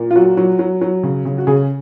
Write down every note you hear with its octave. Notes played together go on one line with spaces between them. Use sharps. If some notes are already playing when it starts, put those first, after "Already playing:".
Already playing: A#2
F4
F#3 F#4
F#3
F#3
F#3
C#3
C#3
F#4
C#3 G#4